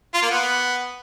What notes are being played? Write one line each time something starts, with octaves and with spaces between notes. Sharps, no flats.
F4
A#3
B3